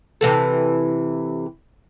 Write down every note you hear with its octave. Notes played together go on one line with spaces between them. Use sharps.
C3 E3 A4